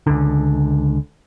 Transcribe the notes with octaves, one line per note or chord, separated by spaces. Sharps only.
C#2 D3